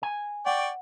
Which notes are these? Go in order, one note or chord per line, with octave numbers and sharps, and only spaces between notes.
G#5
D5 F#5 G5 C#6